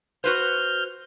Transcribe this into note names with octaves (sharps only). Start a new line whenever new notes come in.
F#4 B4 C5 F6 G6